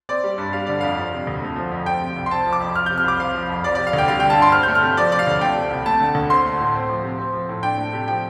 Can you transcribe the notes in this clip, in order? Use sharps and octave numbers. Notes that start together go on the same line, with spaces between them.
C4 D5
G3
G2
G3 F5
D3 D5
F2 F5
F3
C3
D2
A3
F3
F2
F3 G5
C3
C2
C6
C4 A5
F3
D6
F2
F3 F6
C3 G6
F6
C2 D6
C4 F5
F3
F2
F3 D5
C3 D5
F5
D2 G5
G3 F5
D3 G5
A5
G2 C6
C4 F6
A3 G6
F6
C3
F3 D5
C3 D5
F5
D2
A3 G5
C3
C2
A3 A5
D3
D2
C4 C6
A3
A2
C4
F3
C3
C4
F3
A2
D4 G5
A3
C3
F3 G5